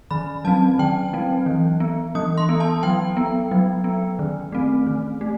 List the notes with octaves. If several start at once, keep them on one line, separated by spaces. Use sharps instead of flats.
D#3 B5
F#3 C4 A5
D#3 G5
F#3 C4
E3
B3
E3 D#6
C6
B3
A5
F#3 G5
B3
F#3
B3
D#3
A3 C4
D#3
A3